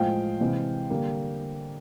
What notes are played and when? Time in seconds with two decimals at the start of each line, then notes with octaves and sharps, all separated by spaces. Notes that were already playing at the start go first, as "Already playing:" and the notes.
Already playing: A2 F3 G#3 F5 G5
0.40 C3 E3 G#3
0.90 D3 G3 A#3